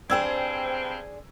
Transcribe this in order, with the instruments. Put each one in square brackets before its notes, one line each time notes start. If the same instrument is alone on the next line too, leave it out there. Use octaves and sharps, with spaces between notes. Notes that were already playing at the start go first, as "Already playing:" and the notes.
[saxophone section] G2 C4 [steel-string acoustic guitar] D4 G#4 C5 [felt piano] G5 E6 G#6